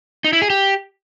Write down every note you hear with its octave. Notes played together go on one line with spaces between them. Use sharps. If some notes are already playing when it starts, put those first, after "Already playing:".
D#4
E4
G#4
G4